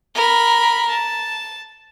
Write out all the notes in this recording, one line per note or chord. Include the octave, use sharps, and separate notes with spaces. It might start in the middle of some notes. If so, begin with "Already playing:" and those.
A#4 B5
A5